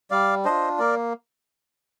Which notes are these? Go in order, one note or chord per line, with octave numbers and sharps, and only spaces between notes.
G3 D5 F5
D4 F4 C5 D#5
A#3 A#4 D5